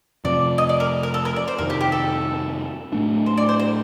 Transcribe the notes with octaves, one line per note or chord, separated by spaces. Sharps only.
F2 C3 F3 D5
D#5
D5
A#4
A#4
A4
A#4
D5
C5
F2 C3 D#3 A#4
G4
G4
A4
A2 A3 D4
C5
D5
C5
C5